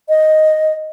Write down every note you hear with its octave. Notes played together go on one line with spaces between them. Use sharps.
D#5